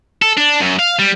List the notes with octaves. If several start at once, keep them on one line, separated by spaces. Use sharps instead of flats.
A4
D4
F#2
F5
G3